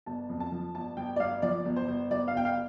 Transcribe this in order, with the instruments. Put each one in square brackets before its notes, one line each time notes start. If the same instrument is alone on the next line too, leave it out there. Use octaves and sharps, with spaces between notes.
[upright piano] G1 A5
F2
A5
F3
G1 A5
G1 G5
D5
G1 F5
F3 D5
G1
C5
G1
G1 D5
F5
G1 G5
F5